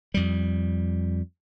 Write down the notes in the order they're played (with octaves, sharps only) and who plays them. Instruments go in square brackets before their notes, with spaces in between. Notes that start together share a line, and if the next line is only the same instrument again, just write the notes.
[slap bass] F2 G3